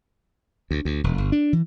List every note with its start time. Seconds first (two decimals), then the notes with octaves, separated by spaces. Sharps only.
0.71 D2
0.85 D2
1.04 E1
1.18 G1
1.32 D4
1.53 E3